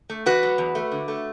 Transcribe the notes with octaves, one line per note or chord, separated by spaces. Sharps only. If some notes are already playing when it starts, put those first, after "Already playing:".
A3
E2 F#4 B4
F#3
E2
A3
D3
A3